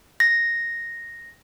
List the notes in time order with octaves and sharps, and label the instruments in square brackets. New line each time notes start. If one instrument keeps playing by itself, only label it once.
[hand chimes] A#6